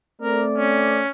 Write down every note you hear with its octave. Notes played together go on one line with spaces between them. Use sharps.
A3 C4 A#4 D5
C#4